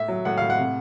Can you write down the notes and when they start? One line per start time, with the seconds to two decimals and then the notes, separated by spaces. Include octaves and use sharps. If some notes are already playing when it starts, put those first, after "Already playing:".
Already playing: A2 E5
0.08 F#3
0.25 A2 F#5
0.37 A2 F5
0.50 F#5
0.59 C3